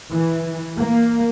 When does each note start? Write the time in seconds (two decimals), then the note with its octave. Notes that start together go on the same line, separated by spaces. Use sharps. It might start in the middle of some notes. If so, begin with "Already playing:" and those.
0.12 E3
0.77 A#3